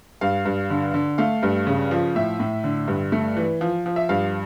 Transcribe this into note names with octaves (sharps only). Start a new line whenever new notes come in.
G2 F5
G2
D3
D3
A3 F5
G2
C#3
F3
A2 E5
A2
D3
G2
A3
E3
F3
F3
E5
G2 F5